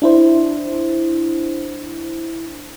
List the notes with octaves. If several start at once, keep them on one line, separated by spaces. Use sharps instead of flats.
D4 E4 C5